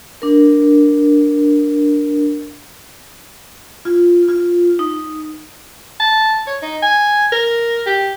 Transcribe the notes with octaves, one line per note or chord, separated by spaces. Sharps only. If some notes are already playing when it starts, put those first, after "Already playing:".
D4 A#4
F4
F4
D#4
A5
C#5
D#4
G#5
A#4
G4